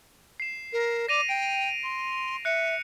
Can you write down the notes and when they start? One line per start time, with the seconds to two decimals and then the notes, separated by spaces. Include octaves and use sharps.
0.40 C7 E7
0.72 A#4
1.09 D5 A#6 D#7 F7
1.29 G5 D7
1.84 C6
2.45 E5 F#6 C#7